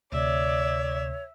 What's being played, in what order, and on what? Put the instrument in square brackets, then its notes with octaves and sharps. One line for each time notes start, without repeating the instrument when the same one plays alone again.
[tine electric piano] D2 C3 [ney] C#5 [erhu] D5 [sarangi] E5